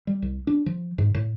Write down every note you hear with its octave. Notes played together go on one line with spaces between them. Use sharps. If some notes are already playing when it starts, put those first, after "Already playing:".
G3
C2
D4
F3
G#2
A2